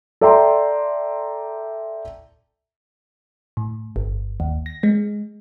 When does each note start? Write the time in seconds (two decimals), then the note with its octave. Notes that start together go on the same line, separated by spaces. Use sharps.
0.21 A4 D5 E5 G5 A#5 C6
3.57 A2
3.96 G1
4.40 D#2
4.66 A#6
4.83 G#3